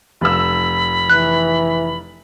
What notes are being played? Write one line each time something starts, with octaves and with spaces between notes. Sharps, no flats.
F1 B5 E6
E3 F#6